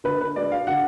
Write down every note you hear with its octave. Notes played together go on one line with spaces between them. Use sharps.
D3 B4
B4
G#3 D4 D5
F5
D3 F#5